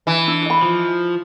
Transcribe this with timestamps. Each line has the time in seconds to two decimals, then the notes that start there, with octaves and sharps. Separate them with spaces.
0.07 E3
0.27 D4 E4
0.46 D#5 B5
0.62 F3